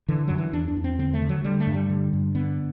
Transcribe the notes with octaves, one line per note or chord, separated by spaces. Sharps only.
D3 E3
F#2 F#3
E3
E2 D4
D4
E2
C4
D3 C4
A3
D3
F#3
D3 G3
A3
G2
G3
D3
G2
D3 B3